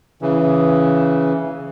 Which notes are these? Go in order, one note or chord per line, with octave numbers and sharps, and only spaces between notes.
C#3 E3